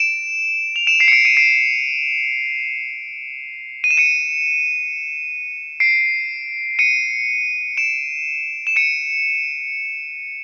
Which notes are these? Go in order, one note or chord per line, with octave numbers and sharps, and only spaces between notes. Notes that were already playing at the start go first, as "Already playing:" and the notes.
Already playing: D7 E7
F7
D7 E7
C7 D7
C#7
C7 D7
C#7 D#7
C7 D7
D#7
E7
C#7 D#7
C7 D7
C#7 D#7
D7 E7
E7
C#7 D#7